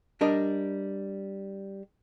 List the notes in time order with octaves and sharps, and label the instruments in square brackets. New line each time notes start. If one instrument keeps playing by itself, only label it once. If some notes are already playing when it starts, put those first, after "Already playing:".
[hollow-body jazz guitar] G3 D4 A#4 D#5